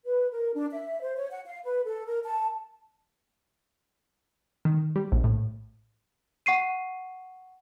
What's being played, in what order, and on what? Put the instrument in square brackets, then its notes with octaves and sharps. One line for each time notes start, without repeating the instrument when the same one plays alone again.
[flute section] B4
A#4
D4
E5
C5
C#5
F#5
F5
B4
A4
A#4
A5
[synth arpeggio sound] D#3
G3
A#1
A2
[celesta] F#5 C#6 C7 D#7